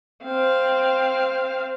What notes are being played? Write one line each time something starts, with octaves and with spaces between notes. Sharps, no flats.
C4 F5